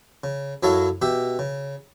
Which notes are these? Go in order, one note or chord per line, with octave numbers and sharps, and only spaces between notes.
C#3
F#2 F#3 E4 A4 C#5 F5
B2 G4 E5
C#3